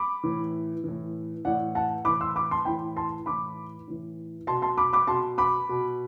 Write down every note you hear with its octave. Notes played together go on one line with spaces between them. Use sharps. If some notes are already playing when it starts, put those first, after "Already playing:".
Already playing: B5 D6
A2 E3
A2 E3
A2 E3 D5 F#5
F#5 A5
A2 E3 B5 D6
C6 E6
B5 D6
A5 C6
A2 E3 G5 B5
A5 C6
A2 E3 B5 D6
A2 E3
B2 A5 C6
A5 C6
B5 D6
B5 D6
B2 A5 C6
B5 D6
B2